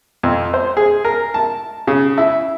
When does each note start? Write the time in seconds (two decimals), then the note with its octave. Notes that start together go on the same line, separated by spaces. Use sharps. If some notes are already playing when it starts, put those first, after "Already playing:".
0.23 F2
0.54 C5
0.77 G#4
1.05 A#4
1.34 A5
1.87 C#3
2.18 E4